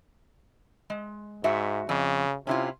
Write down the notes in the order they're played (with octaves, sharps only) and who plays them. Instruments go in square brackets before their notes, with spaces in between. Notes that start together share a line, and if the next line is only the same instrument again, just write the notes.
[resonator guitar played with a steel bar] G#3
[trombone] G#2 [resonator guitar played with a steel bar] G#3 F#4 E5
[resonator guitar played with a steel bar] F2 [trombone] C#3
[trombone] C3 [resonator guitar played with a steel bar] C#4 E4 F4